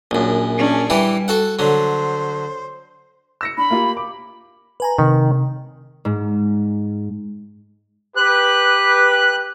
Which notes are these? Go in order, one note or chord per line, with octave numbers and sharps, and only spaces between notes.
A#1 F#2
C#4 D4 G#4
E3 G3 E4 G4
F#4 A4 F#5
D3 F#3 C5
E6 A#6 C#7
D4 B5
A#3 F4 G4
D6
B4 G#5 A#5
C3 D#3
G#2
G4 B4 F#6